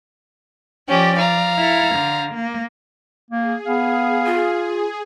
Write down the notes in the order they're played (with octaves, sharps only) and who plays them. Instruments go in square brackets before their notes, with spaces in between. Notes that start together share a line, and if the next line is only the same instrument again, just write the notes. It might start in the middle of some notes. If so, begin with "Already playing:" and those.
[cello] F3 D5 [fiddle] C#4 G4
[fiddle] F5 A#5
[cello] E4 A4
D3
A#3
[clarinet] A#3 [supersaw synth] G#4
[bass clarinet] B3 [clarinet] F5
[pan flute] F4